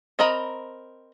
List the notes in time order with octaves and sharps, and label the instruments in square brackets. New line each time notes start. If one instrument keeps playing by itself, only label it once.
[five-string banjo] C4 A#4 D#5 A#5 B5